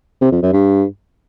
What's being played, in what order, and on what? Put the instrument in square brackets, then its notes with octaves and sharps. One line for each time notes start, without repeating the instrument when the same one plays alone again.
[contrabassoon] C3
F2
F#2
G2